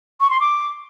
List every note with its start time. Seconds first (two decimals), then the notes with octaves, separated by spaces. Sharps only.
0.20 C#6
0.30 C6
0.40 D6